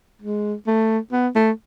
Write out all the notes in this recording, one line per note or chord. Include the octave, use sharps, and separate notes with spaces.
G#3
A3
B3
A3